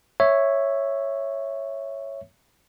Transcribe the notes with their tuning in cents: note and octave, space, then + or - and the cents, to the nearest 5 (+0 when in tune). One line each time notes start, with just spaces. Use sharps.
C#5 -5 E5 +0